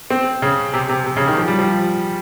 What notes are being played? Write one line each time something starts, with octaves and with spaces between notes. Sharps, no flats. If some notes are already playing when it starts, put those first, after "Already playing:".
C4
C#3
C3
C3
C3
C#3
D#3
F3
G3
F3